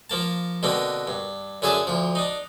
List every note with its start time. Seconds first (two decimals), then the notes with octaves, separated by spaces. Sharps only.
0.10 F3 A#3 A5
0.63 B2 D3 A#3 C4
1.07 G2
1.62 F#2 D3 G#4 E5 G#5 A5
1.87 D2 F3
2.15 D4 D#4